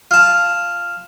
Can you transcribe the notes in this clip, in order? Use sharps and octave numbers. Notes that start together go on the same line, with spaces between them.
F4 A5